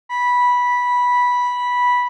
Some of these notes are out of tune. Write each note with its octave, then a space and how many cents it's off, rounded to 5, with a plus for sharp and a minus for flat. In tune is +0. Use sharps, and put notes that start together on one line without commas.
B5 -10